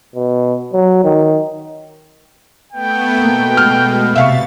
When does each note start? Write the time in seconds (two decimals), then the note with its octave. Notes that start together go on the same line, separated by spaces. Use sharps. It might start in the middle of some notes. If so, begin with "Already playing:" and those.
0.15 B2
0.73 F#3
1.04 D#3
2.73 A3 B3 G5
3.18 B2 A#3
3.57 G#3 A3 F6
4.15 C3 E5 F5 C#6 A6